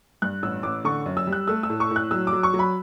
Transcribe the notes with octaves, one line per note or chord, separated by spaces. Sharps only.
G2 F#6
A1 E6
A1 D6
D3 C#6
F#2
E6
G3
F#6
A3 E6
E6
A2
C#6
A2
F#6
F#3 E6
D6
F#3
C#6
F#3
B5